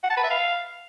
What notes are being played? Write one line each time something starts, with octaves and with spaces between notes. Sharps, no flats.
F#5
A5
B4
E5
F5